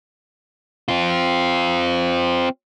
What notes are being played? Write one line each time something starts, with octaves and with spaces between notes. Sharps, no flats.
C4 F4